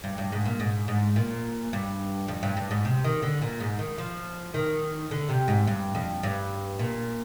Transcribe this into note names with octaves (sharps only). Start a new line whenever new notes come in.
G2
G2
G#2
A#2
G#2
G#2
A#2
G2
F2
G2
G2
G#2
C3
D#3
D3
A#2
G#2
D#3
F3
D#3
D3
C3
G#2
G2
F2
G2
A#2